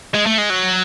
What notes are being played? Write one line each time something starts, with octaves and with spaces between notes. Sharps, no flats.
G#3
A3
G#3
F#3